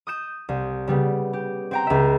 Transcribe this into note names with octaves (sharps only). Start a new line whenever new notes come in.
D#6 G6 E7
C2
C#3 G3 B3
G4
C4 G5 A#5
C#2 E5